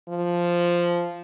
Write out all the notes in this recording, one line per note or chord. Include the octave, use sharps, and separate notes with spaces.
F3